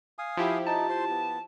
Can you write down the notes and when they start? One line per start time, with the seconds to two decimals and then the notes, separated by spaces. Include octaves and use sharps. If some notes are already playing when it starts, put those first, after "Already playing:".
0.19 F5 G#5 D#6
0.37 F3 E4 G4
0.67 D#4 A5
0.90 C5 C6
1.10 B3